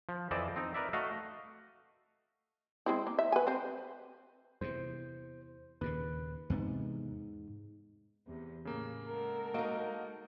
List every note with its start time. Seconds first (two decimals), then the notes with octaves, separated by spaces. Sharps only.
0.09 F3
0.31 F2 E3 C4 D5 D#5 A5
0.56 C4 D#4
0.74 A#4 B4 D5 E5
0.93 A3 F#4 D#5 F5
2.86 G#3 C4 E4
3.07 A#3
3.19 E5
3.32 B4 G#5
3.47 C4 C5
4.61 E2 C3 C5
5.81 D#2 A#2 C#3 B4
6.50 E2 G#2 C3 B3
8.27 E2 C3
8.65 A2 C#3 A#3
9.07 G#3 A4 A#4 F#5
9.54 A#3 D#4 F#4 D#5 D7